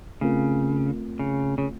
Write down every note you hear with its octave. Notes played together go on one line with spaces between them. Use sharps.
C#3 A3 C4 F4 A#4
C#3
C#3